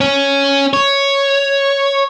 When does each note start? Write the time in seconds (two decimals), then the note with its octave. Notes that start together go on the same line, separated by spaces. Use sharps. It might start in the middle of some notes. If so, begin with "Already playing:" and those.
0.01 C#4
0.73 C#5